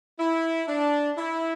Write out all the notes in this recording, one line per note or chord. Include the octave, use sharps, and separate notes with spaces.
E4
D4
E4